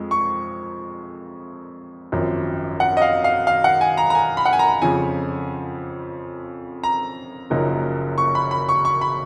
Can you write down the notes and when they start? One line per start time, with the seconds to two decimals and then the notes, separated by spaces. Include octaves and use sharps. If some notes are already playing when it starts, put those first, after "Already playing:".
Already playing: F2 F3 G#3
0.11 C#6
2.12 G#1 F#2 F3
2.80 F#5
2.97 D#5
3.02 F5
3.24 F5
3.47 F5
3.64 F#5
3.81 G#5
3.98 A#5
4.10 A#5
4.15 G#5
4.37 B5
4.45 F#5
4.53 G#5
4.59 A#5
4.82 F2 C#3 F3 G#5
6.84 A#5
7.50 F#1 F#2 F3 A#3 D#4
8.18 C#6
8.35 B5
8.51 B5
8.69 C#6
8.85 C#6
9.01 B5